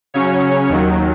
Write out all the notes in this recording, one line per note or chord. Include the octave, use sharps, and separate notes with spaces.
C#3 F#3 C#4 C#5
D#2 D#3 F#3